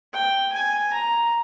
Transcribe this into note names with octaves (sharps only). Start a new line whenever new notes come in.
G5
G#5
A#5